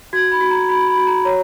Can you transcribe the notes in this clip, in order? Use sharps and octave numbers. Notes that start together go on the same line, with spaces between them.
F#4 G#6
B5
F#4
A#5
F#4 B5
B5
F#4
A#5
C#5 A#5